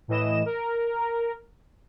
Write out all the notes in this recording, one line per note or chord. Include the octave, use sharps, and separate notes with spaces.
A2 E3 D#5 E7
A#4